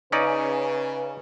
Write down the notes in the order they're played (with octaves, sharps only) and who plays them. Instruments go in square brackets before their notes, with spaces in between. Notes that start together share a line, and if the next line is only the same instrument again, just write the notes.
[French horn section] C#3 B4 [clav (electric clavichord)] C#4 D#4 D5